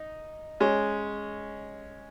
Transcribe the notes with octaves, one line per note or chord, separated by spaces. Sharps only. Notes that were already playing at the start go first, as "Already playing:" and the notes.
Already playing: D#4
G#3 C#4